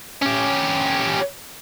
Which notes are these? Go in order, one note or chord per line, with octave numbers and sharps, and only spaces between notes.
C#4 G4